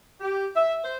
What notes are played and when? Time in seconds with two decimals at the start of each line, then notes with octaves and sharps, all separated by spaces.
0.21 G4
0.55 E5
0.82 C5